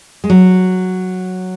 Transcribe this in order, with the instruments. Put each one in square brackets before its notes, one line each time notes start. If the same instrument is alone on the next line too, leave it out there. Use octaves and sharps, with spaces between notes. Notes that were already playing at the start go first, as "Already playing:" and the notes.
[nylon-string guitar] G#3
F#3